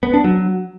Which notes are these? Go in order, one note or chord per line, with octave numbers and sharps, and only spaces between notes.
B3
D4
F#3